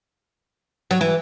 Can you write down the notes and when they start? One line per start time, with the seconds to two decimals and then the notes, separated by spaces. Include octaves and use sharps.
0.91 F#3
1.01 E3